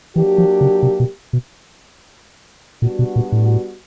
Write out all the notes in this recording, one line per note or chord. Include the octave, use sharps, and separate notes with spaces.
E3 F#3 A#3 D4 G4
F3
C#3
C3
B2
B2
A#2 G3 B3 D4 F#4
B2
A#2
A2